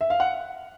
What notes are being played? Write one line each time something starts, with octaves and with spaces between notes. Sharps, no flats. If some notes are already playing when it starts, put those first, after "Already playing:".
E5
F5
F#5